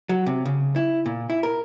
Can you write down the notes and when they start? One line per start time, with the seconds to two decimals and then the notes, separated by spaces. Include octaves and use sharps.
0.09 F#3
0.26 C3
0.45 C#3
0.76 E4
1.06 A#2
1.30 E4
1.43 A#4